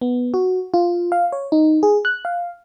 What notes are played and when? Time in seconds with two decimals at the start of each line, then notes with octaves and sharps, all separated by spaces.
0.01 B3
0.34 F#4
0.74 F4
1.12 F5
1.33 C#5
1.52 D#4
1.83 G#4
2.05 F#6
2.25 F5